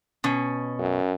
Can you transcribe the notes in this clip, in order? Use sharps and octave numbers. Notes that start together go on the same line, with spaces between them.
B2 C#4
F#2